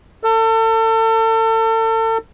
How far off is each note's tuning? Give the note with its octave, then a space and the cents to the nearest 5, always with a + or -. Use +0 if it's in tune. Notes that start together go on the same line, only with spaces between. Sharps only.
A4 +35